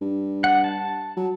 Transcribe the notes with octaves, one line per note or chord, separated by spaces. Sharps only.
G2
F#5
A5
F#3